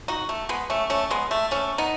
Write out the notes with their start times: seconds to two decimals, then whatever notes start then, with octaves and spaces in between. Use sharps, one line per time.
0.08 D#4 F#4
0.29 A3
0.49 G#3 B3
0.70 A3 C#4
0.90 A3 C#4
1.10 G#3 B3
1.31 A3
1.51 A3 C#4
1.78 B3 D#4